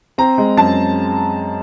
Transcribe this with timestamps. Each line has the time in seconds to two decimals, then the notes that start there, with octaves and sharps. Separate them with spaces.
0.18 C4 A#5
0.38 G#3
0.57 F#2 A5